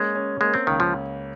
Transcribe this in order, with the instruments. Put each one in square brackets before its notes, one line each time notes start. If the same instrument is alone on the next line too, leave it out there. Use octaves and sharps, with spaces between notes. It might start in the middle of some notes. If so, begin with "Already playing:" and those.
Already playing: [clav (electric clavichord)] G#3 [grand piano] A#3 C#4
[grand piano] C#4
[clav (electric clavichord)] G#3 [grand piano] A#3
[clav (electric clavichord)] C4
[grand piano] C#2 [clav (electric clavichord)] D#3
[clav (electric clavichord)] F3